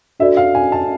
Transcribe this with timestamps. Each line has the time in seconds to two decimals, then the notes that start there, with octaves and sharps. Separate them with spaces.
0.20 D4 F#4 A4 D5 E5
0.37 F5
0.55 G#5
0.72 A5